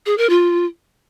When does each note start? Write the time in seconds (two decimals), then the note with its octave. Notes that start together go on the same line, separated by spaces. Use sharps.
0.06 G#4
0.18 A#4
0.29 F4